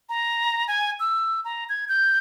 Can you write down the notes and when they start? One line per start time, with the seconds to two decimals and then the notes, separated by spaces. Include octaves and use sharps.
0.09 A#5
0.68 G#5
1.00 E6
1.45 A#5
1.69 G#6
1.89 G6